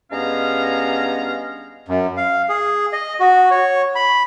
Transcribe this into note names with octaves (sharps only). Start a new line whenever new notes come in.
G2 G#3 B3 C#4 F5 A#5
F#2
F5
G#4
D#5
F#4
C#5
B5